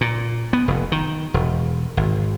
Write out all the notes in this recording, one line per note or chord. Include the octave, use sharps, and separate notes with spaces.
A#2
B3
F1
D#3
E1
G#1